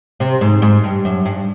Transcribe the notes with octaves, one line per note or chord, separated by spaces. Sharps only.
C3
G#2
G#2
G2
F#2
G2